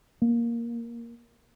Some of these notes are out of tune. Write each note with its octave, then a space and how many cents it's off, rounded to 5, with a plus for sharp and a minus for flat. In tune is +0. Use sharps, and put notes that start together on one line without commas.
A#3 +5